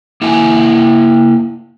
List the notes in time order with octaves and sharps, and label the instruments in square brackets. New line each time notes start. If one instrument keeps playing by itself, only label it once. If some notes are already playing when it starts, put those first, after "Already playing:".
[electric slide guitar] A#3 E4 E5 G#5